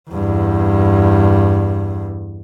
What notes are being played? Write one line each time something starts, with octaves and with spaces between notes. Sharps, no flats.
E2 G2